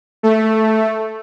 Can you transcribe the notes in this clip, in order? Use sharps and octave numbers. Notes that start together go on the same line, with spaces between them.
A3